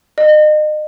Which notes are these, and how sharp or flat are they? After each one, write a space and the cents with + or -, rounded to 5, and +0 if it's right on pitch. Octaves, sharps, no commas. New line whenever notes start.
D#5 -35